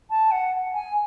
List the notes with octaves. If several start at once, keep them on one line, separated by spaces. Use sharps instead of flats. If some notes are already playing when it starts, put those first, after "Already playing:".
A5
F#5
G#5